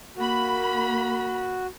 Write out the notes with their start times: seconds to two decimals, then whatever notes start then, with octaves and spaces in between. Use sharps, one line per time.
0.16 A#3 F#4 B5